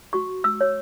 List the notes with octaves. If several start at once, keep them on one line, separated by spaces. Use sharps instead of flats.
F#4 C#6
E6
C#5